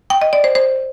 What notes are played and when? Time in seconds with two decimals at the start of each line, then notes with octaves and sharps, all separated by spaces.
0.10 G5
0.22 D#5
0.33 D5
0.44 C5
0.55 C5